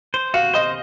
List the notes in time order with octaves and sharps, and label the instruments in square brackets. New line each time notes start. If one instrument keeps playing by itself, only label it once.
[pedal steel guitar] C5
[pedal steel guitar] F#4 [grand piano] F5
[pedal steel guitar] C5 [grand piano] D#5